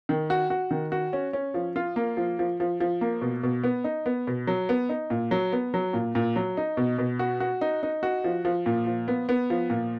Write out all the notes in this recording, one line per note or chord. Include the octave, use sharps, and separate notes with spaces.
D#3
F#4
F#4
D#3
F#4
C#4
C#4
F3
F4
A#3
F3
F3
F3
F3
A#3
B2
B2
B3
D#4
B3
B2
F#3
B3
D#4
A#2
F#3
B3
F#3
A#2
A#2
F#3
D#4
B2
B2
F#4
F#4
D#4
D#4
F#4
F3
F3
A#2
F3
B3
B3
F3
A#2